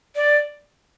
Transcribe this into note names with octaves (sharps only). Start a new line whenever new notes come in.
D5